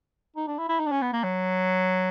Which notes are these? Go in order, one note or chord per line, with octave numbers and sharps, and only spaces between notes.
D#4
D4
E4
E4
D#4
D4
C#4
B3
A#3
F#3